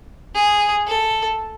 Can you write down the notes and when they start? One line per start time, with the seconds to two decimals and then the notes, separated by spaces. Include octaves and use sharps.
0.35 G#4
0.88 A4